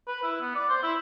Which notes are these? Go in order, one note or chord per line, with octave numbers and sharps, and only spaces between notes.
B4
E4
B3
D5
C5
E4